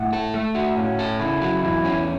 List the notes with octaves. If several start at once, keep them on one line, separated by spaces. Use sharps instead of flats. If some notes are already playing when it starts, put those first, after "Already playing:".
Already playing: A2 F#5
A4
A3 E5
F#4
A2 C#4
A4
C#3 E4
F#3
E2 E4
C#4